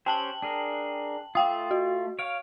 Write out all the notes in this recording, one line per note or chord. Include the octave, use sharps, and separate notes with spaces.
C#4 G4 C5 G5 A5 F#7
D4 G#4 A#4
A3 F4 F5 G5 D#6
F#4
C#5 F5 D7